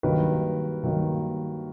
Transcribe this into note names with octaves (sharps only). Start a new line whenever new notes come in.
G2 D#3 F#3 A#3 D#4 B4
G2 D#3 F#3 A#3 D#4